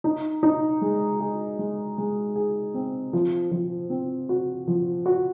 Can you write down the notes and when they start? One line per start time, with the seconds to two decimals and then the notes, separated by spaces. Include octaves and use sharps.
0.04 D#4
0.43 D#4
0.81 G#3
1.20 G#4
1.59 G#3
1.98 G#3
2.36 G#4
2.74 C4
3.13 F3
3.51 F3
3.90 C4
4.29 F#4
4.67 F3
5.06 F#4